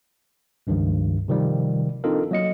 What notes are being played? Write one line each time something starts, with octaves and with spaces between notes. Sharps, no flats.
C#2 G2 D#3 F3
C3 D#3 F3 G3
C4 D4 D#4 F4 A4 A#4
F#3 A#3 D#5 C#7